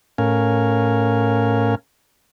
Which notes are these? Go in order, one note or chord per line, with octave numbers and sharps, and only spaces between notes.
A2 C#4 A#4 F5 G#5